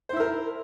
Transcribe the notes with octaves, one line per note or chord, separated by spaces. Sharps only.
E4 A#4 C5 E5